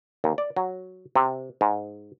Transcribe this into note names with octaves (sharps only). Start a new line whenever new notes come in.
D#2
D5
F#3
C3
G#2